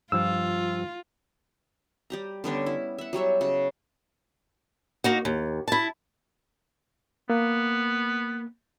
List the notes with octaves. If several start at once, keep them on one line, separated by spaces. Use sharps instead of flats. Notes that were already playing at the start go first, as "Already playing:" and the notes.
G2 F3 F4 E6
G3 G4 A#5
D3 G3 B3 C#4
E4
E5 F#5
F#3 G3 C#5 E5
C#3 F#4
A#3 D#4 F#4
D#2
E4 A5
A#3 B3